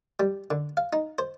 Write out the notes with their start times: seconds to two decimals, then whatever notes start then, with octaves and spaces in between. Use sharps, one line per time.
0.20 G3
0.50 D3
0.77 F5
0.93 D#4
1.18 C5